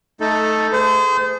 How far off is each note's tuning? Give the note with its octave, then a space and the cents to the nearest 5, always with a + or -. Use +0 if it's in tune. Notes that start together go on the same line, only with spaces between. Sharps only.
A3 -5 D#4 +10 A4 +0
A3 +0 G#4 +0 C5 -35